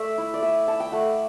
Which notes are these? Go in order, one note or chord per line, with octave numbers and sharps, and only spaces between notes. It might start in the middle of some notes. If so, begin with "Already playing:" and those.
Already playing: A3 D5 E5
E4
D5
A3 E5
E4 A5
G5
A3 F#5